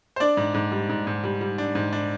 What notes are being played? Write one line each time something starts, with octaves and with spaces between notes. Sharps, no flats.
C5
D4 D5
G#2
G#2
G3
G#2
G#2
G3
G3
D4
G#2
D4